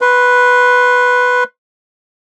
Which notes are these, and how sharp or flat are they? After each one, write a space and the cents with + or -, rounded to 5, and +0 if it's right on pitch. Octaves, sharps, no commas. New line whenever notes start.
B4 +0 C6 +20